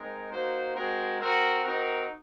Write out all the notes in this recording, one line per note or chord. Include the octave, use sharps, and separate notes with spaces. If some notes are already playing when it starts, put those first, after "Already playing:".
Already playing: G#3 C4 D#4 A#4
A#3 D#4 F#4 C5
G#3 C4 F#4 A#4
C4 F#4 A#4
C4 D#4 F#4 A#4